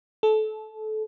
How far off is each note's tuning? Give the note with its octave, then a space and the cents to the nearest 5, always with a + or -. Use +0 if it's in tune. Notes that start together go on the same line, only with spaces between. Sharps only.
A4 -25